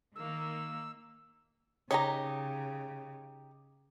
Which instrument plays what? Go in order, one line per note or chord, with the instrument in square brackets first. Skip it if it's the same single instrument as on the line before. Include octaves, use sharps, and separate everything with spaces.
[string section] D#3 A#3 [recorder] E6
[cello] C#3 [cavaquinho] D#4 G4 D#5 [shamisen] C#5 A#5